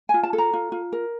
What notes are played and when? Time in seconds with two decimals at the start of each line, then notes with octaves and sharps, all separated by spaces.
0.09 F4 G#5
0.23 A5
0.33 A4
0.38 A#5
0.53 F4
0.72 F4
0.93 A#4